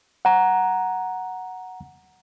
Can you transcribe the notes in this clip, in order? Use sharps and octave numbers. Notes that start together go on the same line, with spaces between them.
F#5 A#5